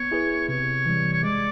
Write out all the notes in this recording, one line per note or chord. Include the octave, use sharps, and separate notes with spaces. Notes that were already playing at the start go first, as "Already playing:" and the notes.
Already playing: B3 C#5
E4 G#4 B4
C3 C#5
E3 G3
C#5
G#3 D5